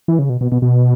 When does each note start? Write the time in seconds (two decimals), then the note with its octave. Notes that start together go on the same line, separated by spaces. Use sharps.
0.08 E3
0.19 C#3
0.29 B2
0.41 B2
0.52 B2
0.62 B2